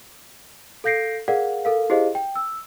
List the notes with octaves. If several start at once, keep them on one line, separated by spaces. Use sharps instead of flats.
A4 F5 G6 A#6 C7 D7
G#4 A#4 D5 F5 F#5
A4 A#4 F5
E4 G4 G#4 C5 D#5 F5
G5
E6